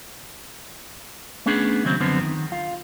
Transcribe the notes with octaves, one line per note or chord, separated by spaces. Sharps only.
A3 B3 C#4 D4 G#4
D#2 C#3 F#3 C4
F#2 D3 F3 B3 C4
D#3
F4